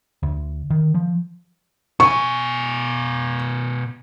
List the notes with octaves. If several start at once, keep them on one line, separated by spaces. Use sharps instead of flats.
D2
D#3
F3
B2 G#5 C#6